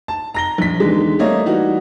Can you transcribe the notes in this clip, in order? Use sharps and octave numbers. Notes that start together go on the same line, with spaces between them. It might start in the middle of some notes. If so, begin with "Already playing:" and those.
A5
A#5 A#6 G7
A#1 B6
E2 D3 D#3 G#3
G3 A3 A#3 C#5 D#5
E3 G3 D#4 F#4